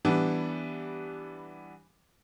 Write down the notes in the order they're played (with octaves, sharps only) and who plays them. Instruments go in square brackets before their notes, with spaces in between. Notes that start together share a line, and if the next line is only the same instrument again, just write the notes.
[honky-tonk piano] E3 G3 B3 D4